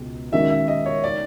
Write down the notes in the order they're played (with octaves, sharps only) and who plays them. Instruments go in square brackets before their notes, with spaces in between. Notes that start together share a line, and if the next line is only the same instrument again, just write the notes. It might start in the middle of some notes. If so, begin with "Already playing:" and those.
Already playing: [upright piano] C#2 B2
[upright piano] D#3 G#3 C#4 F#4 A#4 [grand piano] E5
[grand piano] E5
D#5
C#5
D5